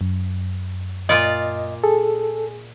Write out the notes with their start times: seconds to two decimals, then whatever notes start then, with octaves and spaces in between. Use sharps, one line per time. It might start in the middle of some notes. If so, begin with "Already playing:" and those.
0.01 F#2
1.09 A#2 F4 D5 D#5
1.84 G#4 A4